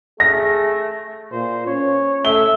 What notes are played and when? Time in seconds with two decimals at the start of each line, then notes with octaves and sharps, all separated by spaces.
0.20 A3 G#4 A#6
1.32 A#2 C5
1.67 C#4 C#5
2.25 A3 E5 G7